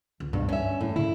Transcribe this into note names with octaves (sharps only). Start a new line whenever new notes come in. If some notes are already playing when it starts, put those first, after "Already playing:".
C#2
G2 B2
G2 C#4 E5
A2
C#3 E4